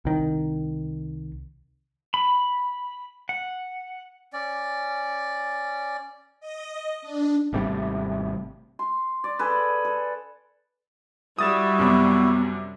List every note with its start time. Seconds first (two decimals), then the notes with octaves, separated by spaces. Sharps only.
0.05 C2 D#3
2.14 B5
3.29 F#5
4.33 C#4 D5
6.40 D#5
7.02 D4
7.53 G#1 C3 G3 A3
8.79 C6
9.24 D5
9.39 G#4 A4 B4
9.85 A4
11.39 G3 E4 F#4 D#6 A6 E7
11.79 F#2 C3 B3 D6